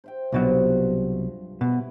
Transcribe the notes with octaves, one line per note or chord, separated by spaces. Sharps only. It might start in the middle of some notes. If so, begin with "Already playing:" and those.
C5 E5 G5
C2 G2 B2 F3 F#3
B2 E4 B4